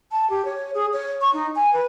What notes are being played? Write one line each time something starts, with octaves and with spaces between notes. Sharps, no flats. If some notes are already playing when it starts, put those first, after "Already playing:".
A5
G4
C#5
G#4
C#5
C#6
D#4
G#5
B4